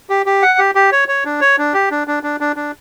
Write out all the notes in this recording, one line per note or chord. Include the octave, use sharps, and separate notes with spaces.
G4
G4
F#5
G4
G4
C#5
C#5
D4
C#5
D4
G4
D4
D4
D4
D4
D4